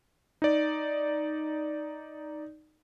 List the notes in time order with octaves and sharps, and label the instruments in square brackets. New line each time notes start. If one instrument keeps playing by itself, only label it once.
[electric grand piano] D#4 D5